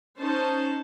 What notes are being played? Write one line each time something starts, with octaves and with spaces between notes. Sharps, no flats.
C#4 D#4 C5 A5